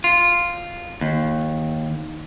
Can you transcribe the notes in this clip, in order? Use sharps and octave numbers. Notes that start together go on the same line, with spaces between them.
F4
D#2